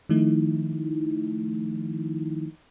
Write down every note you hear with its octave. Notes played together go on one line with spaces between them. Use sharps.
D#3 F3 A3 D#4 E4